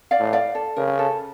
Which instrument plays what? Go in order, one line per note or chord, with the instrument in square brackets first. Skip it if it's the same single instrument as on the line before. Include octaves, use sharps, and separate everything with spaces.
[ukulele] D5 F5
[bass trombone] A2
[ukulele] D5 F5
A4
[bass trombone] C#3 [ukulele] A#4
[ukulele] A4